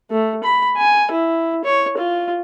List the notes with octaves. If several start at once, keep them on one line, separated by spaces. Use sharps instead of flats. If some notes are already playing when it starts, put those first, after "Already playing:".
A3
B5
G#5
E4
C#5
F4